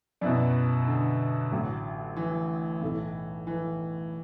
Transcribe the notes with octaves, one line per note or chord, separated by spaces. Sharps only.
F#2 B2 B3 E4 D5
D3
A1 A2 F#3
E3
B1 A2 A3 E4
E3